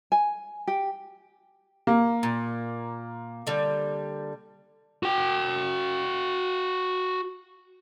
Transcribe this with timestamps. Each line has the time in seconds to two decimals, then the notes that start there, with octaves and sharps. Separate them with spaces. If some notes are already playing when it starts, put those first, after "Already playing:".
0.12 G#5
0.67 G4
1.87 A#3
2.23 A#2
3.47 D3 G3
5.03 F#4 G5